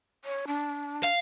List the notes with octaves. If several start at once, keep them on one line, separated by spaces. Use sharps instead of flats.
C#5
D4
F5